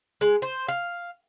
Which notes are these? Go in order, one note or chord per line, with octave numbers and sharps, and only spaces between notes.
G#3
C5
F5